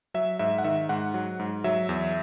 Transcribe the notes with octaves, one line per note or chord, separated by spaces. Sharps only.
F#3 E5
G#2 E5
F#5
D#3 E5
G#2 F#5
F#3
G#2
F#3 E5
E2